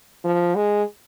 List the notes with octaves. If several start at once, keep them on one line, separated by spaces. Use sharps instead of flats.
F3
G#3